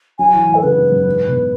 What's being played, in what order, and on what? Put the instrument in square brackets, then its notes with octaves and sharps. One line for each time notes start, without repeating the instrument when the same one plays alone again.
[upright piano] F#3 [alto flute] G#5
[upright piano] E3
A2
[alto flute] A4
[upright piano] C#3 [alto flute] B4
[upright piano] G#2
F#2
G#2
B2